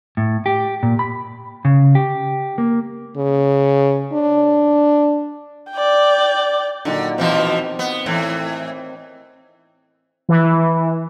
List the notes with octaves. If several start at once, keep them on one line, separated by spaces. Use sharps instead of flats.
A2
G4
A#2
B5
C#3
G4
A#3
C#3
D4
D5 G5
A#2 D3 D#3 F#3
B2 E3 F3 C4
B3
A2 E3
E3